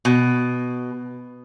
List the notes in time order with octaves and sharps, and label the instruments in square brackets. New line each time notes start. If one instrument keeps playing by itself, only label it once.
[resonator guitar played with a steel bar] B2